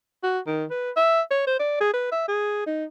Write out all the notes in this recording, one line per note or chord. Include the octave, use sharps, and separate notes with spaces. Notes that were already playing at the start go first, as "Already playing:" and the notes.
F#4
D#3
B4
E5
C#5
C5
D5
G#4
B4
E5
G#4
D#4